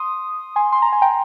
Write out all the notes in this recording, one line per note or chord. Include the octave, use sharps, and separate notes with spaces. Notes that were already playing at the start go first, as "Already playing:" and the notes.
Already playing: C6 D#6
G#5 C6
C6
A#5
G#5
G5 A#5